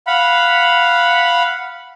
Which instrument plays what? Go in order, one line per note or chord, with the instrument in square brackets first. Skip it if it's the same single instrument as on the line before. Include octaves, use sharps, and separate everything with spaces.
[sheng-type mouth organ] F5 F#5 B5